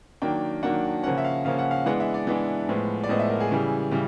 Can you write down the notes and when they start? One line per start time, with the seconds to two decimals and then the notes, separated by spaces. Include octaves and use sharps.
0.22 D#3 F#3 A#3 D4 G5
0.63 D#3 F#3 A#3 D4 F#5
1.03 C#3 F3 A#3 C#4 F#5
1.18 E5
1.25 F5
1.45 C#3 F3 A#3 C#4 F5
1.59 F#5
1.71 F5
1.86 E3 G#3 B3 D4 F#5
2.00 E5
2.14 D5
2.27 E3 G#3 B3 D4
2.69 A2 F3 G#3 B3
3.04 D5
3.09 A2 F3 G#3 B3 D#5
3.19 E5
3.30 A#4
3.40 G#4
3.51 C#3 E3 G3
3.91 C#3 E3 G3